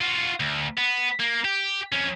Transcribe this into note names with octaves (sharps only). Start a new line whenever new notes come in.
F4 F#4
D2
B3
A#3
G4
F2 C#4